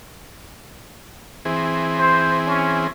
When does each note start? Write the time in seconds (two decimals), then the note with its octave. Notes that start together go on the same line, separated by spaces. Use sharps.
1.45 E3 C4 G#4
1.98 C5
2.47 C#4